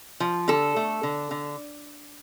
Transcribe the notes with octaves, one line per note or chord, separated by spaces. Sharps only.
F3
D3 A4
A3
D3
D3